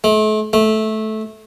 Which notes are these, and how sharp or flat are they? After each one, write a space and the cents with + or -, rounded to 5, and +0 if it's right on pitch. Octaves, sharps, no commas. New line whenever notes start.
A3 -40
A3 -15